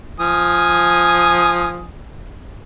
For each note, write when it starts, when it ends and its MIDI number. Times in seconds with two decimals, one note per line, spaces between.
0.20 1.87 53
0.20 1.87 80
0.20 1.87 87